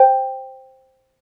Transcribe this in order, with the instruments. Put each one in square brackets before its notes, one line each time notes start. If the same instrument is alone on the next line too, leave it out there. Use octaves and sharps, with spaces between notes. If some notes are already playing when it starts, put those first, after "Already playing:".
Already playing: [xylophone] C5 G5